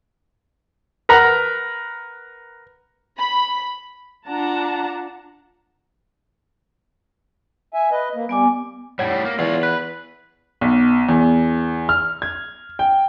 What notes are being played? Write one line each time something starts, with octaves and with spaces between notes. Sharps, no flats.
A#4 B4 F#5 A#5
B5
D4 F4 F#5 A5 A#5
E5 G#5
B4 D#5
A#3
G3 B3 G#5 D6
A2 G3 C#5 F#5 G#6
A#3
E2 F4 C#5 F#5
B4 F#6
B1
E2
F6
G#6
G5